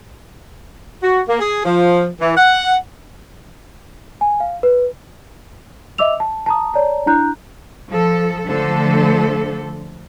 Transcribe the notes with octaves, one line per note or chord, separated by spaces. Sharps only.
F#4
A#3
G#4
F3
E3
F#5
G#5
F5
B4
D#5 E5 D6 E6 F7
A5
A5 A#5 D#6
C#5 D5 A5 A#5
D4 E4 A#5 F#6 G6
F3 A4
D3 F3 A3 A4 C5